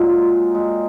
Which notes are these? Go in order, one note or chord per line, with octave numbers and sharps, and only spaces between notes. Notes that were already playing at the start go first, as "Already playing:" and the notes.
Already playing: A#2 F#3 G#3
G#3